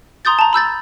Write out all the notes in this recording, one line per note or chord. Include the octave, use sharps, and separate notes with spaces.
A#5 C6 D#6 G6 A6
A5 A#5
B5 E6 G6 A6